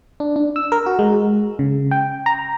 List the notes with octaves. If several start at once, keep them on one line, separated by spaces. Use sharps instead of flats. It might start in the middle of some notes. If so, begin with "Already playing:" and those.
D4
D4
E6
A#4
F#4
G#3
C#3
G5
A#5